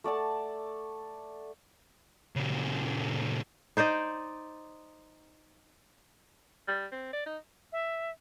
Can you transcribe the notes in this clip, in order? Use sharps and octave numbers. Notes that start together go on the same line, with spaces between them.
A3 D5 F#5 A5
A#2 C#3
D#4 C5 D5 D#5
G3
C4
D5
D#4
E5